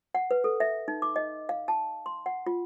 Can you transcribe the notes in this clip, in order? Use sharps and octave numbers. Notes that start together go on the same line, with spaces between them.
F#5
B4
A4
E5
D#4
D6
D#5
F5
A5
C6
F#5
F4